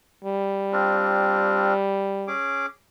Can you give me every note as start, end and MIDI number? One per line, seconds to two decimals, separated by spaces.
0.25 2.33 55
0.73 1.74 60
0.73 1.74 62
0.73 1.74 65
2.27 2.66 61
2.27 2.66 68
2.27 2.66 86